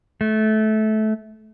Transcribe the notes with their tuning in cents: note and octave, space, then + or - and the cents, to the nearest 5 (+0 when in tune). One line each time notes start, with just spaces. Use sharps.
A3 -20